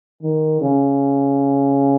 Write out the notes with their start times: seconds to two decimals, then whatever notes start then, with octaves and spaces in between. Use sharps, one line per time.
0.23 D#3
0.61 C#3